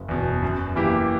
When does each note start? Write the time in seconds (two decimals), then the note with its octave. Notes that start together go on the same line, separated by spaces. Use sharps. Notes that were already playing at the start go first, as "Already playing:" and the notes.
Already playing: F#1
0.09 E2 B2
0.43 F#2
0.76 E3 A#3 E4 G4